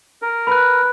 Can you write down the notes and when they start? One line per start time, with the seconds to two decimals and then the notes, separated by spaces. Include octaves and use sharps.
0.22 A#4
0.47 B4 B5 F#6